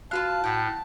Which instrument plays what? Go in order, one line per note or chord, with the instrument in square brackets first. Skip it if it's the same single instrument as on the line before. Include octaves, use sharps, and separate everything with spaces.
[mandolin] F4 B4 F5 [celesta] F#4 F#6 [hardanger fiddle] A5
[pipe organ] A2 [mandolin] F#5 G5